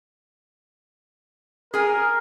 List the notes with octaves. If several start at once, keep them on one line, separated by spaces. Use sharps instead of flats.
G#4 A#4 G#5